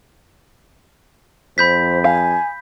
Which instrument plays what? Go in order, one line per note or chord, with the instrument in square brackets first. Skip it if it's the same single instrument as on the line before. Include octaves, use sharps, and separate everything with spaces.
[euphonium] F2 [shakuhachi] C5 [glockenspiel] B5 G6 B6
[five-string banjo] F5 [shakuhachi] G#5